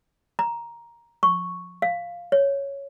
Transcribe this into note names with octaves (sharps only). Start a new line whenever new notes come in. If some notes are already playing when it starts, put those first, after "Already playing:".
A#5
C#6
F5
C#5